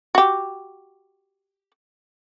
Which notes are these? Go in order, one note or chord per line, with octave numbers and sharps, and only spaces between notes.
F#4 G4